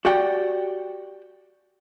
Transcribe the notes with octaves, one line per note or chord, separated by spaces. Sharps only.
F#4 G4 D5 F#5 G5